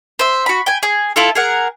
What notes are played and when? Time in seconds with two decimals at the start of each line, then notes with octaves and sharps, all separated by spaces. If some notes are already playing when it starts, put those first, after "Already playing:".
0.19 C5 E5
0.46 F#4 B5
0.66 G5 G#5
0.83 G#4
1.16 E4 F4 A4
1.35 G#4 A#4 F#5